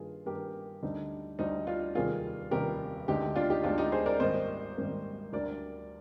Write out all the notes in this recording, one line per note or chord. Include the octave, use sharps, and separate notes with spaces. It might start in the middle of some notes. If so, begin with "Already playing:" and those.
Already playing: G2 D#3 A#3 F4 G#4
G2 D#3 A#3 G4 A#4
D2 D3 G3 D#4
D2 D3 G3 D#4
D4 F4
F1 D#2 D#3 G3 F4 G#4
F1 D#2 D#3 G3 G4 A#4
D2 D3 G#3 D#4 G4
D4 F4
D#4 G4
D2 D3 G#3 D4 F4
D#4 G4
G#4 C5
A#4 D5
G#1 G#2 G3 A#3 C5 D#5
G#1 G#2 G3 A#3
D2 D3 G3 A#4 D5